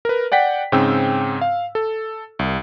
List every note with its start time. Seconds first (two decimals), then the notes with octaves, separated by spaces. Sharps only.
0.05 A#4 B4
0.32 D5 F#5 G5 B6
0.72 G#2 C#3 C4 G5 E6
1.42 F5
1.75 A4
2.39 C2